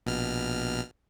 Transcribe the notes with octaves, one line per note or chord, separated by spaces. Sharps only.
A#1 B2 F6